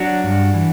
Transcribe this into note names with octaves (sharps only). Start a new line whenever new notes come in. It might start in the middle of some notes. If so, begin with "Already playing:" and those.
Already playing: F#3 D4 F#4
G2
E3